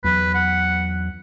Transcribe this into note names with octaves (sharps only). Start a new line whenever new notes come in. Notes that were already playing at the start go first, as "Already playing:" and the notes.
E2 F#3 B4
F#5